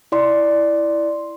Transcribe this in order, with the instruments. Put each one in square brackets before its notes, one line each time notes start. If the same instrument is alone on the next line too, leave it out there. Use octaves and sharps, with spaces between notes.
[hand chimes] E4 D5 C6